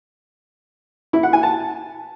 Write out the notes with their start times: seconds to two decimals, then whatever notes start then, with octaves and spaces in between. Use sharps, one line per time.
1.13 E4
1.23 F#5
1.33 G#5
1.43 A5